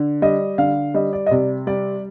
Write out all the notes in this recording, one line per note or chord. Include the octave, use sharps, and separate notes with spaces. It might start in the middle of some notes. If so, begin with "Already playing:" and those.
Already playing: D3
G3 D#5
D3 F5
G3 D#5
D5
D#5
C3 D5
G3 D5